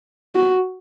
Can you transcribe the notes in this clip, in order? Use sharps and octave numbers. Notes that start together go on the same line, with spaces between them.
F#4